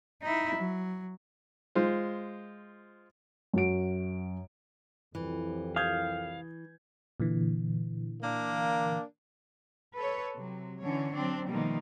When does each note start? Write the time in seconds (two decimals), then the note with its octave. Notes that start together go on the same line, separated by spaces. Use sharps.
0.22 D#4 E4
0.56 F#3
1.75 G#3 F4 C5
3.54 F#2 F#4 D7
5.15 C2 F2 E3 G3
5.76 F5 D#6 G6 G#6
7.20 A#2 D3 E3
8.22 A#3 D4
9.96 A4 B4 C#5
10.37 C3 F#3
10.81 D3 E3 C#4 C#5
11.14 F#3 C4 D4
11.48 B2 D#3 F3 G3 A3 A#3